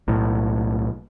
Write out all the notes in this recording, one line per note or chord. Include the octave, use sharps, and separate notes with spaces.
B1 A2